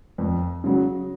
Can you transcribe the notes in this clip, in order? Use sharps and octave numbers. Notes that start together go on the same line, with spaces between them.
F2
C#3 F#3